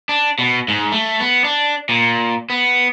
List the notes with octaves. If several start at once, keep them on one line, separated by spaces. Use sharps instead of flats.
D4
B2
G#2
A3
B3
D4
A#2
B3